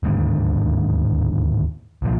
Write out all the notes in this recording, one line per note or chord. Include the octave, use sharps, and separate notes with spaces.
D1 D#2 G#2 D3
C2 A#2 F3